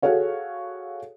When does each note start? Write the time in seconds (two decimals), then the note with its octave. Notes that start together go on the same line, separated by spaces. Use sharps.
0.02 F#4 G#4 A4 C#5 F5